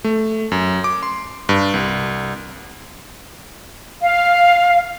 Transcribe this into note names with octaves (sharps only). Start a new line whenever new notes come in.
A3
F#2
D6
C6
G2
C2
F5